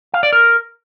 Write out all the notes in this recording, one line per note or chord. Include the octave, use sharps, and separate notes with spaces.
F5
D5
A#4